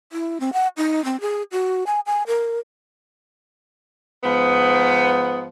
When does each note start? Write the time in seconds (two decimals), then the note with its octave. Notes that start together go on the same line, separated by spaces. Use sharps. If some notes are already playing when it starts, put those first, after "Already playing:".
0.12 E4
0.40 C4
0.53 F#5
0.77 D#4
1.05 C4
1.21 G#4
1.52 F#4
1.86 G#5
2.06 G#5
2.27 A#4
4.23 G#2 F3 B3